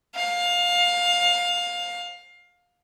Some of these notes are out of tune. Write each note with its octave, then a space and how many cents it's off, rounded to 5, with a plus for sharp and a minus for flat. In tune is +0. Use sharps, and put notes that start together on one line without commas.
F5 +20